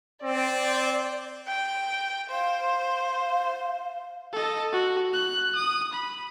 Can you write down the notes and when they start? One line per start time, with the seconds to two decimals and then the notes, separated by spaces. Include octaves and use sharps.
0.23 C4 D5
1.48 G5
2.30 C5 F5
4.33 A4 D#5
4.72 F#4
5.14 F#6
5.56 D#6
5.94 B5